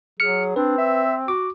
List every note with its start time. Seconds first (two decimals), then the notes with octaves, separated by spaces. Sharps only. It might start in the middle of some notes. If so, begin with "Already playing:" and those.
0.20 F#3 G#4 F6 C#7
0.56 C4 D4 B4
0.78 E5
1.28 F#4 D6